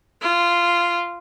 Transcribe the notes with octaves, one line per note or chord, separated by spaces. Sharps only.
F4